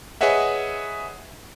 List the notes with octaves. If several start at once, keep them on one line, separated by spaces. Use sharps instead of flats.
G#4 B4 C#5 D#5 E5 F#5